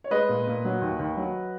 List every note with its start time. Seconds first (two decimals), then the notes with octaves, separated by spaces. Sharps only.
0.04 C#5
0.11 G#3 B4 D#5
0.29 A#2
0.47 A#2
0.65 F#3
0.82 D#2
0.99 D#2
1.17 F#3